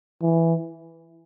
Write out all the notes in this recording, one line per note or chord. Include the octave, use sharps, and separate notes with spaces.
E3